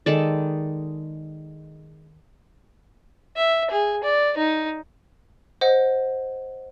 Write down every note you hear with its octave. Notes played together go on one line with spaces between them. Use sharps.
D#3 G#3 A4 D5
E5
G#4
D5
D#4
C5 D#5 F#5